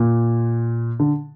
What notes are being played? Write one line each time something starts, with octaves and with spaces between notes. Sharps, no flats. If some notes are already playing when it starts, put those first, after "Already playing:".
Already playing: A#2
D3